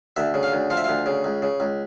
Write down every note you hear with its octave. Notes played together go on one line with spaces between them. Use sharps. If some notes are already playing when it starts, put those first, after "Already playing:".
D2 E5
C#3
F5
D2
F3 F5
E5
D2 F5
C#3
C#2
C#3
C#2